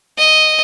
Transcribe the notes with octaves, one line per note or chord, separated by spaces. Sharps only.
D#5